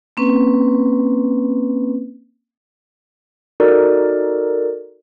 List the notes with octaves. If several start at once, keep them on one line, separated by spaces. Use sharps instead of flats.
A#3 C4 C#4 B4
D#4 F#4 A4 A#4 D5